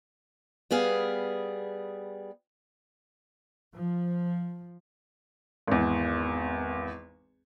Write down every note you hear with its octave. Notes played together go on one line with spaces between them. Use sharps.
G3 B3 G#4 F5
F3
G#1 E2